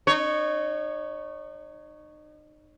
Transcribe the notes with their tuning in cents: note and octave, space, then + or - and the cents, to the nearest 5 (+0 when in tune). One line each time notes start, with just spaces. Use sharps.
D#4 -35 C#5 +0